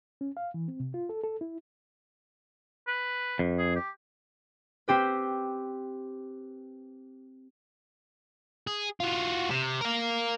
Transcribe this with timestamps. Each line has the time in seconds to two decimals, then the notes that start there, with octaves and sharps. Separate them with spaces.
0.21 C#4
0.37 F5
0.54 E3
0.68 C4
0.80 C3
0.94 F4
1.09 A4
1.24 A4
1.41 E4
2.87 B4
3.39 F2
3.59 G#4
3.76 G4
4.88 C4 G4 B4
8.67 G#4
9.00 F4 F#4
9.50 C3
9.81 A#4 F5